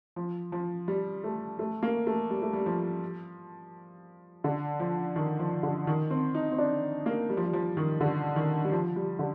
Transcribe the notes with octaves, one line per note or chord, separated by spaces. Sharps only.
F3
F3
G3
A3
A3
A#3
A3
G3
A3
G3
F3
D3
F3
D#3
F3
D3
D#3
C4
D#4
C4
D4
A#3
G3
F3
G3
F3
D#3
D3
D#3
G3
F3
G3
D3